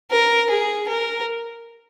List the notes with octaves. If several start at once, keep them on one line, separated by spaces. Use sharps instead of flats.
A#4
G#4
A#4